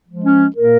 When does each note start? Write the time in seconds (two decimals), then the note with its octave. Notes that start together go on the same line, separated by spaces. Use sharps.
0.08 F3 G#3
0.25 C#4
0.56 A#2 A#3 A#4